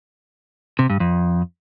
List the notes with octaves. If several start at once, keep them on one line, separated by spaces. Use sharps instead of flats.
C3
G2
F2